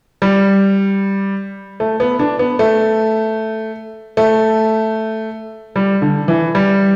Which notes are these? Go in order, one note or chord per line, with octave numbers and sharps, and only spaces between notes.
G3
A3
B3
D4
B3
A3
A3
G3
D3
E3
G3